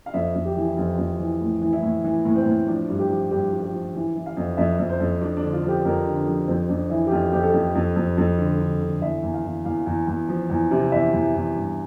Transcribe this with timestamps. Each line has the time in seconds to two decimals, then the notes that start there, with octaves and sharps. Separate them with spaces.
0.06 F5
0.13 F2 E5
0.35 F2
0.45 G4
0.56 E3
0.65 E4
0.77 F2 F4
0.98 F2
1.19 E3
1.41 A2
1.61 E3
1.73 E4
1.83 A2
2.04 E3
2.25 A2
2.36 C4
2.46 A2
2.67 F3 D4
2.89 G2
2.99 G4
3.10 F3
3.31 G2 G4
3.52 F3
3.62 G4
3.73 F3
3.95 E3
4.16 E3
4.26 F5
4.37 F2
4.57 F2 E5
4.79 F2
4.89 C5
5.00 F2
5.21 F3 D4
5.37 D4
5.42 D3
5.53 F4
5.63 F3 G4
5.85 F2 A#4
6.06 D3
6.17 D4
6.27 F3
6.48 F2 C4
6.69 F2 D4
6.90 E3 E4
7.07 G4
7.11 F2 F4
7.32 F2 G4
7.43 A4
7.53 F2
7.75 F2
7.96 F2
8.18 F2
8.38 D3
8.60 D3
8.81 D3
9.02 E2 E5
9.23 E2
9.34 F5
9.44 E2
9.65 E2 F5
9.86 E2
10.08 E2
10.29 F3
10.50 E2
10.71 C3
10.92 E2 E5
11.13 E2
11.34 E2
11.55 G2